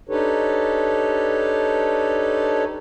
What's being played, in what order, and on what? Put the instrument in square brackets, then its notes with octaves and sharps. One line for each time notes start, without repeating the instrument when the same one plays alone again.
[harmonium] D4 D#4 G4 A4 B4 C#5